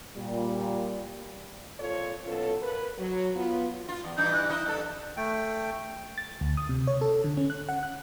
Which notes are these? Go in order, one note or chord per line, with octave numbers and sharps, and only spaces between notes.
A#2 G3
F2 A#2 C4 F4 A4 C#5
B2 F#3 C#4 F4 A4
A#4 B4
F#3
B3 F4
F4
E2
G2 E3 D#4 G6
F#6
D#4 E4 D#5
G2 A4
A3 G5
A6
D2
D#6
C3
C#5
A4
D3
C#4
F#6
F#5
F#6